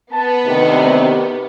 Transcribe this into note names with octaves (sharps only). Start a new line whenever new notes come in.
B3 A5
D2 C3 D#3